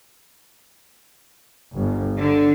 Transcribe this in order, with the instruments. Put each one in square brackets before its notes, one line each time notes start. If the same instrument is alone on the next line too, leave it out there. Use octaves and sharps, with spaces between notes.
[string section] G1
D3